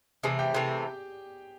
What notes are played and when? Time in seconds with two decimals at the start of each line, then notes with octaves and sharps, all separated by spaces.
0.23 C3 E3 A3 G#4 G#5
0.39 G4 G5
0.54 C3 E3 A3 G4 G5